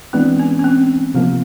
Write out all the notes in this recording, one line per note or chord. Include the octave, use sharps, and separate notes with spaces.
E3 G#3 B3 C4 D4
C#4
C#4
C4
C3 F3 A#3 B3